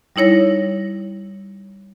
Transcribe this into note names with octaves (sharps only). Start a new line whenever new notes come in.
G3 D#4 E4 C#5 A#6